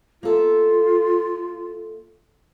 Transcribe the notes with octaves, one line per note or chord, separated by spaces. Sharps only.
A#3 F4 A4 E5